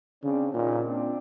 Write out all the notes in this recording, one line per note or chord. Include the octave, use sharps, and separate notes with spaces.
C#3 C4 D4
A#2 C#4 D#4
C4 D4